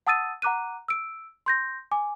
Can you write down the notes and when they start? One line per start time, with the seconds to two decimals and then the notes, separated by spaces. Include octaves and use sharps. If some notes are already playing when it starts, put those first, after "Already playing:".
0.07 F#5 A5 D#6 E6 A6 D#7
0.42 F#5 A#5 D6 F#6 D#7
0.88 E6 D7
1.46 C6 G6 A#6
1.91 G#5 D6